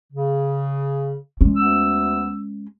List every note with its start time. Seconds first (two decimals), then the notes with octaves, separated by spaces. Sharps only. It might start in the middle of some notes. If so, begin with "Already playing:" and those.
0.13 C#3
1.41 G#3 C#4
1.57 D2 B3 E6